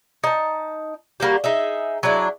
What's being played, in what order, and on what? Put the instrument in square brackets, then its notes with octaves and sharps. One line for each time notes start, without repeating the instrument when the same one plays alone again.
[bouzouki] D#4 A5
G3 A#3 F#4 G4
D#4 G#4 E5
F#3 G#3 D4 E4